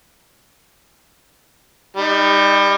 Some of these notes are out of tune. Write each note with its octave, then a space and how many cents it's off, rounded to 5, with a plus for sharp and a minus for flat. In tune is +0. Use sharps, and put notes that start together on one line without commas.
G3 +25 D#4 +0